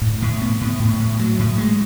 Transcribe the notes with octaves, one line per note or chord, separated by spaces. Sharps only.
A2
A2
B3
A2
A2
A2
F#3
A2
G#3